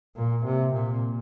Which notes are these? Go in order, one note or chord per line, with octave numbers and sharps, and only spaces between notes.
A#2
C3
A#2